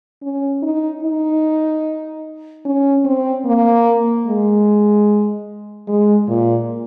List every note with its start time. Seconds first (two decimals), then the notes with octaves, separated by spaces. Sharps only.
0.22 C#4
0.62 D#4
1.03 D#4
2.65 C#4
3.05 C4
3.46 A#3
4.26 G#3
5.88 G#3
6.28 A#2